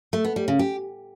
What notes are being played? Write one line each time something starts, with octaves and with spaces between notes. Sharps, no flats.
A3
B3
G3
C#3
G4